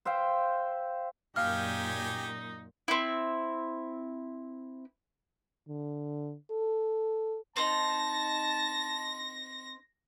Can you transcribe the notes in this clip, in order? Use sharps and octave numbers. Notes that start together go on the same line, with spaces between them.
C5 E5 F5 G5
F#2 A#2 D#4 G4 F5 G#5 F6
C4 E4
D3
A4
C4 D#4 A5 A#6